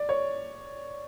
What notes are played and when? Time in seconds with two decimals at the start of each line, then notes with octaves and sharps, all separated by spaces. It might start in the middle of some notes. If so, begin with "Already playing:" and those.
Already playing: D5
0.09 C#5